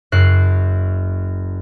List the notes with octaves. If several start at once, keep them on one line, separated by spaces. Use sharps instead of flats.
F#1 F#2 F#6 C7